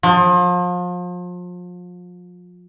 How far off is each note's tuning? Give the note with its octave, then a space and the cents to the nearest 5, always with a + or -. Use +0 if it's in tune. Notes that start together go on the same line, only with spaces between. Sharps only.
F3 +35